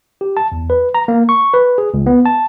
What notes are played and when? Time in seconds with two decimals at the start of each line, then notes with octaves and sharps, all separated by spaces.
0.21 G4
0.37 A5
0.52 E2
0.70 B4
0.94 A#5
1.08 A#3
1.29 C#6
1.54 B4
1.78 G#4
1.94 C#2
2.06 B3
2.26 A5